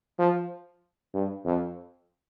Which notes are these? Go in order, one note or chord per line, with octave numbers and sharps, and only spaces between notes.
F3
G2
F2